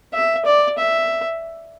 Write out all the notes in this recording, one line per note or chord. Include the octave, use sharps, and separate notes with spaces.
E5
D5
E5